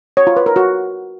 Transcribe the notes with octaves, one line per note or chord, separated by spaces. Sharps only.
C#5
F4
B4
A#4
F#4